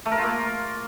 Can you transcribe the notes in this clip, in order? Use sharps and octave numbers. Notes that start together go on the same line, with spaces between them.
A3
A#4
F4
A#3